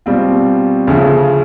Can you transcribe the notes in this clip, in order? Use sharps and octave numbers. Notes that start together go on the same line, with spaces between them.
B2 G3 C4 F4
D2 C#3 F3